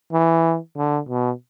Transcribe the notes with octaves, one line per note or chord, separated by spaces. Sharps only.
E3
D3
B2